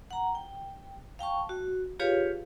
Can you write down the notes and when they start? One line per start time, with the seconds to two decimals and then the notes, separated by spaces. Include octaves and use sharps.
0.11 F#5 A#5
0.35 G5
1.19 F5 G5 A5 C#6
1.49 F#4
2.00 F4 G4 G#4 B4 C#5 F5